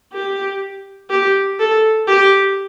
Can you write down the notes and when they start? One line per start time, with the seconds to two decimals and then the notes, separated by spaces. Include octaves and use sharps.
0.13 G4
1.10 G4
1.59 A4
2.07 G4